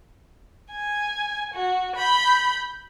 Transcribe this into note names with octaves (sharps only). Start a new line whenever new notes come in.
G#5
F#4
B5 G6